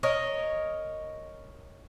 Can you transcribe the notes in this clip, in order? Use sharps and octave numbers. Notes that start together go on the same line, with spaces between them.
A#4 C#5 D#5